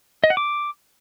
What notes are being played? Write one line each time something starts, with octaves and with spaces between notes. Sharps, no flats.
D#5
F#5
D6